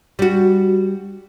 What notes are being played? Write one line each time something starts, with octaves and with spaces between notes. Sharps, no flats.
G3 F#4